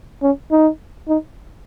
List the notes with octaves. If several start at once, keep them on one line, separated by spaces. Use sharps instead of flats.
C#4
D#4
D#4